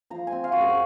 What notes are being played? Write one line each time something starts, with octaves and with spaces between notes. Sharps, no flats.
F3 A#5
G#5
C4
F5
F#2 F#4
G#4